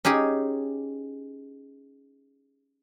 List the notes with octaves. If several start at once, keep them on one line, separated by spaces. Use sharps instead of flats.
C#4 D#4 G4 G#4